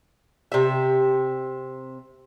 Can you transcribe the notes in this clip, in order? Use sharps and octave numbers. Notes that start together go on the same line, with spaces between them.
C3 E5